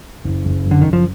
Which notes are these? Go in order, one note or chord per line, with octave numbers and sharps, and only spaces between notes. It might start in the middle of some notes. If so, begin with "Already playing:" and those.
F#1
F#1
F#2
D3
F#1 D#3
F3